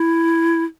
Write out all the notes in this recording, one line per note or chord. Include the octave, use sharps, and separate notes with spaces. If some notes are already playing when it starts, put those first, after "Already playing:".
Already playing: E4